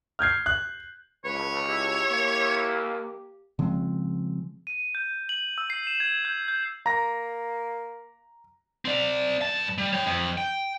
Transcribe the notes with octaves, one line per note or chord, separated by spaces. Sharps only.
F6 G6 G#6 C7
F#6
C#2 B4 C#5
E4 G4
A#3
C#3 F3 G#3 C4
D#7
G6
F#7
E6
C7
E7
G#6
G6
G6
A#3 A#5 A#6
C4 D5
G2 A5
G3
C#5 G5
F2
G5